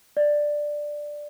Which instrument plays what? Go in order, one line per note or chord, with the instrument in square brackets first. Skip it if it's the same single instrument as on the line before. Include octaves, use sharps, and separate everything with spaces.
[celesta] D5